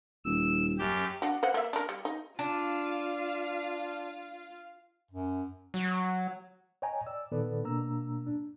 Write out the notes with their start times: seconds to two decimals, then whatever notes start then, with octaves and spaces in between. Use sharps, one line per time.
0.25 D#1 E6
0.78 F#2 G4
1.22 D4 F#4
1.43 B4 C5 F#5
1.54 A#3 E5
1.73 D4 A#4
1.89 G3
2.05 D#4
2.39 D4 F4 F5
5.11 F#2
5.74 F#3
6.82 C#5 D#5 G5 G#5 A#5
7.07 D5 E6
7.32 A#2 D#3 B3 A4 B4 D5
7.64 B2 A#3 D4 A#5 E6
8.26 D4